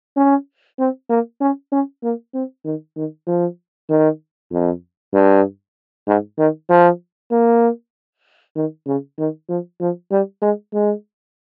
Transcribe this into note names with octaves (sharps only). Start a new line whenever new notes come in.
C#4
C4
A#3
C#4
C#4
A#3
C4
D#3
D#3
F3
D#3
F2
G2
G#2
D#3
F3
A#3
D#3
C#3
D#3
F3
F3
G3
G#3
G#3